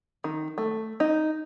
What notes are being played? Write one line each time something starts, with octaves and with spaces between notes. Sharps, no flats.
D#3
A3
D#4